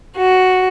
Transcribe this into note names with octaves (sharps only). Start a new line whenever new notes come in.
F#4